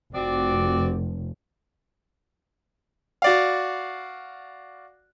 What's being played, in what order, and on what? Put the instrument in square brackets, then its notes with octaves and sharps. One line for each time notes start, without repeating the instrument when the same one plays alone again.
[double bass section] F1 [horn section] C4 F#4 D5
[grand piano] F#4 D5 F5